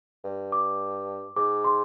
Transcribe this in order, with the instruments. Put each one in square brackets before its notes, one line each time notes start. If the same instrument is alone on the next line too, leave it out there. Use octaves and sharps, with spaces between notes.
[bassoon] G2
[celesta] D6
[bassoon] G#2 [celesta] D6
[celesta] C6